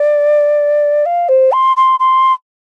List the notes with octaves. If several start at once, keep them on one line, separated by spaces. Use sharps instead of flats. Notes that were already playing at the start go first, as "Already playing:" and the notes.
Already playing: D5
F5
C5
C6
C6
C6